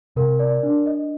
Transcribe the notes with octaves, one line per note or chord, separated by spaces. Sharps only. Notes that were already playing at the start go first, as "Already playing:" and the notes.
C3 A#4
D5
D4
D#5